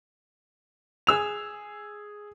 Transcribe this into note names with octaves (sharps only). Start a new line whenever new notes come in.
G#4 E6 F7